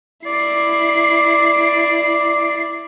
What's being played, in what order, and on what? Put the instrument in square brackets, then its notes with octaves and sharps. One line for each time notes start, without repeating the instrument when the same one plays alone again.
[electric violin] E4 C7 [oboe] D5